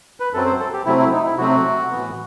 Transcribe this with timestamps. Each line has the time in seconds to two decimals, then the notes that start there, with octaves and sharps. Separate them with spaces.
0.20 B4
0.33 F#2 F#3 C4 A4
0.46 C5
0.60 A4
0.73 G4
0.86 C3 F#3 A3 C4 E4
0.99 E4
1.13 D#4
1.26 E4
1.38 C3 F#3 A3 C4 F#4
1.91 A2 E3 B3